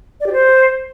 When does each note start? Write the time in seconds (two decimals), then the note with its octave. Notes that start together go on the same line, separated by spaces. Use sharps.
0.20 D5
0.26 G4
0.32 C5